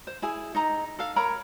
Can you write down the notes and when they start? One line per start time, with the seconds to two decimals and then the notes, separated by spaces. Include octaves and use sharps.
0.07 C5
0.22 E4 G#4 G#5
0.55 D#4 D#5 A#5
0.99 A4 F5
1.16 A#4 C#5 A#5 B5